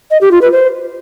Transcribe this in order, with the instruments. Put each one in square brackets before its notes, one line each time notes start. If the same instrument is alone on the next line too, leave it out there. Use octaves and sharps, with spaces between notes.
[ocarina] D#5
G4
F4
B4
C5